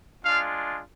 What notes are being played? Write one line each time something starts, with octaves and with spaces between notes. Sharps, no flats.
G#3 D4 F4 F5